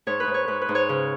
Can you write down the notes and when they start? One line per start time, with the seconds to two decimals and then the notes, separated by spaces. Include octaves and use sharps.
0.07 G#2 C#5
0.20 B4
0.27 G#2
0.34 C#5
0.48 G#2 B4
0.61 B4
0.69 G#2
0.75 C#5
0.89 C#3